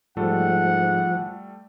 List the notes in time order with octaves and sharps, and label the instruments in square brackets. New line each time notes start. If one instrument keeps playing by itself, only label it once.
[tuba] G#2 [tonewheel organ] F3 [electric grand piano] G3 A3 A4 [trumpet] F#5